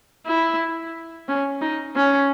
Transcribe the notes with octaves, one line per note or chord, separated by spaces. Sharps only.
E4
C#4
D#4
C#4